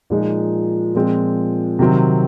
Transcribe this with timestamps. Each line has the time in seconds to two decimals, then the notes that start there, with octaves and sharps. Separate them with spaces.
0.10 A#2 F3 G#3 D#4
0.95 A#2 F3 G#3 C4
1.79 C3 D#3 F#3 C4